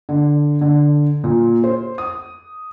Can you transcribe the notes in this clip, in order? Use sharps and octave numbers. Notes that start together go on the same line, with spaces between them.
D3
D3
A#2
C5
D#6